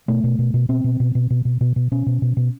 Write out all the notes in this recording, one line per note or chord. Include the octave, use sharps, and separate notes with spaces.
B2 A3
B2
B2
B2
B2 C4
B2
B2
B2
B2
B2
B2
B2
B2 C#4
B2
B2
B2